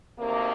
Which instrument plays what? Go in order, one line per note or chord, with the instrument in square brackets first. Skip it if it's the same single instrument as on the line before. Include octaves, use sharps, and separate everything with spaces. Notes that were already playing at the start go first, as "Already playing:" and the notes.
[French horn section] D2 C3 D#3 A#3